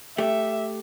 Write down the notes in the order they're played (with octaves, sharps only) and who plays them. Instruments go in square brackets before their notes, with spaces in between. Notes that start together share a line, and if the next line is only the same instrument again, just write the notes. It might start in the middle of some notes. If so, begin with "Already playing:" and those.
[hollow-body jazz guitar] A3 G4 [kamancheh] E5